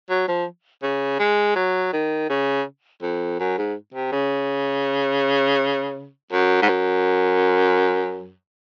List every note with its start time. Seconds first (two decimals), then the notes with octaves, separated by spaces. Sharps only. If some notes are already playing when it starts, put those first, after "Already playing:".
0.10 F#3
0.28 F3
0.83 C#3
1.19 G#3
1.56 F#3
1.93 D#3
2.29 C#3
3.02 F2
3.39 F#2
3.58 G#2
3.94 C3
4.12 C#3
6.32 F#2
6.62 G#2
6.69 F#2